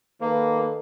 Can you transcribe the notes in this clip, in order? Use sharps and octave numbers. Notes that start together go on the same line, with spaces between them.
D#3 A#3 A4 B4